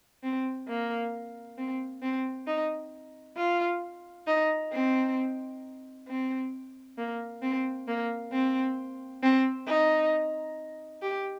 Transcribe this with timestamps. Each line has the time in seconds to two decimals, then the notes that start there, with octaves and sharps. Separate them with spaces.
0.23 C4
0.68 A#3
1.58 C4
2.02 C4
2.47 D#4
3.37 F4
4.27 D#4
4.73 C4
6.08 C4
6.98 A#3
7.42 C4
7.88 A#3
8.32 C4
9.23 C4
9.67 D#4
11.02 G4